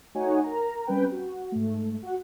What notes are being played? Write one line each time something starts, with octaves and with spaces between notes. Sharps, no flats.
A3 D#4 F#4 C#5 F#5 G#5
A#4 A#5
G3 C4 C#4 B4 G5
F#4
G#2 A3
F#4 F#5